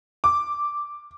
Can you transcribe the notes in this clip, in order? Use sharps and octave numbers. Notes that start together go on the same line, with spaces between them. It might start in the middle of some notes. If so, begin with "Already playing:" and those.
D6